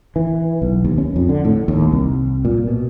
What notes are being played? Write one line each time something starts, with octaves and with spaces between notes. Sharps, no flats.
E3
B1
D#2
C#4
F2
D3
A2
D#2
C2
A#2
B2